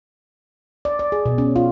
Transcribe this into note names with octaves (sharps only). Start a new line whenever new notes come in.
D5
D5
G#4
B2
C#4
F4